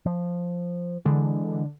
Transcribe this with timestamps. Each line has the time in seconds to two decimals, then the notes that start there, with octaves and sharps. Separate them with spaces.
0.06 F3
1.05 D3 E3 G#3